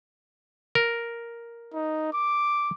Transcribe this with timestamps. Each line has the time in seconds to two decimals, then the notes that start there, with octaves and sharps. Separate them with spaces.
0.75 A#4
1.74 D#4
2.13 D6